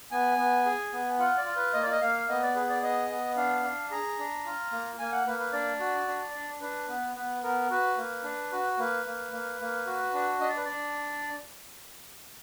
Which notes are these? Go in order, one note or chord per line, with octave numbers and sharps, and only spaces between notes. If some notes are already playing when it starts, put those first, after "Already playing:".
B3 G#5
B3
G#4
B3
F4 F#5
D5
F4
B4
A#3 D#5
D5
D#5
A#3 F5
B3 D#5
D5
G#4 B4
D5
B3 D#5
B3
D4 F5
D4
G#4 A#5
D4
F4
A#3
A#3 G#5
F#5
A#3 B4
B4
D4 D5
F#4
D4
D4
D4 B4
B3
B3 B4
B3 A#4
F#4 B4
A#3
D4
F#4
A#3 B4
A#3
A#3
A#3
F#4
D4
D4 D#5
D5
B4
D4 D5